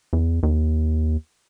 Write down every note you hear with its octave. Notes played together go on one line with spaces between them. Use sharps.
E2
D#2